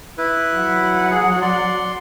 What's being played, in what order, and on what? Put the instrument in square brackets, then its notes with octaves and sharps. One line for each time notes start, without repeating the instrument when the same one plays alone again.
[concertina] E4 B4
[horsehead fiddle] F#3 F#5
[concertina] G#4
D5 C6